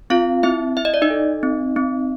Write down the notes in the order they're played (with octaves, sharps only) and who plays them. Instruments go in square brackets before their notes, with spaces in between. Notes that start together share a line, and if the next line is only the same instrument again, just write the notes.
[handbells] C4 F4 F5
C4 E4 E5
E4 E5
D#5
D5
D#4 D#5
A4
C4
C4